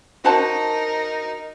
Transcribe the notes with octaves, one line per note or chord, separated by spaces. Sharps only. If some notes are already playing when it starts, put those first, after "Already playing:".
D#4 F#4 A#4 C5 A5